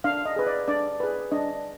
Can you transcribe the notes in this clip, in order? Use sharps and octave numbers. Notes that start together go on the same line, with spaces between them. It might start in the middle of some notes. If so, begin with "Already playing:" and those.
D4 F5
D#5
G#4 B4
D5
D4 D5
G#4 B4
D4 D#5